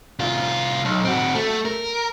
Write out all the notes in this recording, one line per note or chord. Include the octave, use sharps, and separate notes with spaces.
C2 F4
B1
C4 F#4
A3
A#4